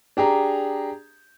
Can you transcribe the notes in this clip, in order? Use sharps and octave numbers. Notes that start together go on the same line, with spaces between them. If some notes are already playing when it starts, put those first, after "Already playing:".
D4 G4 G#4 A#5